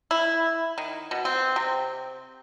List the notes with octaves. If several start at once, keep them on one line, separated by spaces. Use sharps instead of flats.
E4
D#3
B2
C4
C3